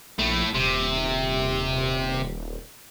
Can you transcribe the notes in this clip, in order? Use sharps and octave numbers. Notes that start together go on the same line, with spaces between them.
A#1 A2 A3
D#1 C3